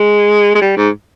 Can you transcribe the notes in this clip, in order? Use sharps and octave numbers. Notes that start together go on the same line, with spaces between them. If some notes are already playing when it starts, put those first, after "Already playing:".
Already playing: G#3
G#3
G3
G#2